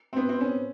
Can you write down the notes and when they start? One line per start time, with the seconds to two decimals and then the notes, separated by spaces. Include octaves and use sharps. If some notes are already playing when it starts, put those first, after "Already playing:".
0.13 C4
0.16 B3
0.29 C4
0.41 C#4